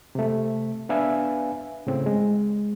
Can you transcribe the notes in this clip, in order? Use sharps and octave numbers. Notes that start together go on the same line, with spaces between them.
C3 A3
B3 D4 B4 E5 F5 G#5
A2 C#3 C4
G#3